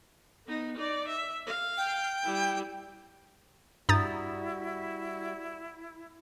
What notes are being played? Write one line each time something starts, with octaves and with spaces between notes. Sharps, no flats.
B3 D#4
D#4 D5
E5
F5
G5
G3 E4
G2 G3 E4 F#4 A#5 D#6 G6 A6